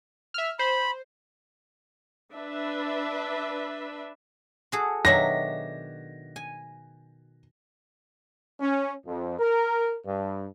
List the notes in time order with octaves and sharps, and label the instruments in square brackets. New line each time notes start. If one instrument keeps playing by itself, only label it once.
[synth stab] E5 F6
[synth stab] C5 [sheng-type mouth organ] B5
[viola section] D4 B4 E5
[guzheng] F#4 G#4 A4
[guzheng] B2 D#3 F#3 [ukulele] D4 C#5 E5 [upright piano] A#6
[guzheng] G#5
[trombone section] C#4
F2
A#4
G2